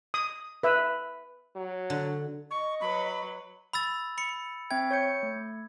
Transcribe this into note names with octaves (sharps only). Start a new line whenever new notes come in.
D#6
B4 E5
F#3
D3
D#5 C#6
F#3 B4 B5
B5 E6 A6
B5 C#7
C4 E5 G5 G#6
C#5 G6 C#7
A3